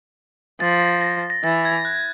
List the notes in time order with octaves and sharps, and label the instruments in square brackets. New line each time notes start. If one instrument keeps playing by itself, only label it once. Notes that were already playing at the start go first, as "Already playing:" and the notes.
[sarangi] F3 [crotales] A6
[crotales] A#6
A#6
A#6
[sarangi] E3 [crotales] A6
[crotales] G#6
F#6